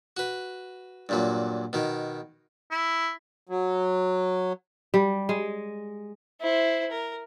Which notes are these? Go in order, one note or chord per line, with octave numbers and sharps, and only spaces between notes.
F#4 B4
G2 A#2 F#3
B2 D#3
E4
F#3
G3
G#3
E4 C5
A#4